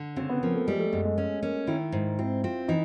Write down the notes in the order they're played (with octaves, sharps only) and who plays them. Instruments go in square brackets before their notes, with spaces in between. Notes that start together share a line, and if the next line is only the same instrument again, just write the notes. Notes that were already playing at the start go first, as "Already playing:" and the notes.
Already playing: [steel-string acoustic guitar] D3
[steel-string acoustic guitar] C#3 [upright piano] C4
[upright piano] B3
[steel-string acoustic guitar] F3 [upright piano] A#3
[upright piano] A3
[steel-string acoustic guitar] G3 [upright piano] G#3
[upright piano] A3
[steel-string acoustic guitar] F#2 [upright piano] G#3
[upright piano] G#3
[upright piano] A3 [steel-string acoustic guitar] C#4
[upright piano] A#3 [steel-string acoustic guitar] C#4
[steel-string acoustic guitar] D#3 [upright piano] E4
[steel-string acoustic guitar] G#2
[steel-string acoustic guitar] C4 [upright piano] E4
[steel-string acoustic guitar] C4 [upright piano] F4
[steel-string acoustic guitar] E3 [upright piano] D#4